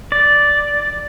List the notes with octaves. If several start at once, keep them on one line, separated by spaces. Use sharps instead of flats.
D5